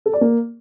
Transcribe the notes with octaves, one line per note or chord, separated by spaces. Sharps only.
A4
D5
A#3